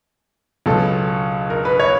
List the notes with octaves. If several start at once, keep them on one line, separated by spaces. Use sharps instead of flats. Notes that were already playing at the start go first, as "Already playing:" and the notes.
C#2 B2 F#3 A4
A#4
B4
C#5